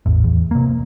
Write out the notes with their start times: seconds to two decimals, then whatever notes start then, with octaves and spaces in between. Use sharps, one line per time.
0.06 A1 E2
0.24 E2
0.51 C3 A#3